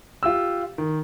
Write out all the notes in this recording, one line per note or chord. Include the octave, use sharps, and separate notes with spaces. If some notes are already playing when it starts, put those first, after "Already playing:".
F4 G4 E6
D#3